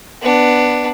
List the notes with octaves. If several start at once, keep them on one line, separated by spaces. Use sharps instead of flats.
B3 D4